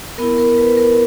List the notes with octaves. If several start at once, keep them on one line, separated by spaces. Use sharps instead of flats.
B3 E4 A#4
A#4
B4
A#4